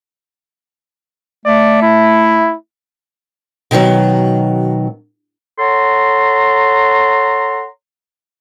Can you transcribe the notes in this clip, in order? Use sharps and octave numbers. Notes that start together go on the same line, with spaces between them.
A3 D5
E4
B2 D#3 F3 F#3
A4 C#5 F#5 A#5 C6